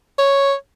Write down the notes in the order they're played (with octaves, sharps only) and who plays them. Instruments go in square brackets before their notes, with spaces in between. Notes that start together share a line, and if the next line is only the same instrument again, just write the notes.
[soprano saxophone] C#5